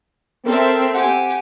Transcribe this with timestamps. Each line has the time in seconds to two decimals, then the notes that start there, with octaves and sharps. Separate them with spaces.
0.47 C4 A4 A#4 E5
0.95 G4 F#5 G#5